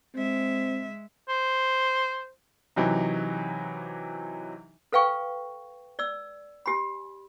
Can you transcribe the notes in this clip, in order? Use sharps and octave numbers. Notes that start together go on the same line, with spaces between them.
G#3 C4 E5
C5
C3 E3 F#3 D#4
A4 B4 F5 G5 C#6
D5 E6
G4 G#5 B5